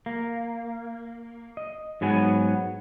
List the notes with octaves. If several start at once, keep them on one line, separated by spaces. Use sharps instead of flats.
A#3
D#5
G#2 F#3 B3 G#5